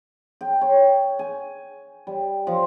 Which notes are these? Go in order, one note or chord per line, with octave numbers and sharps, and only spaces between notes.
G5
C#5
G#5
G3
F3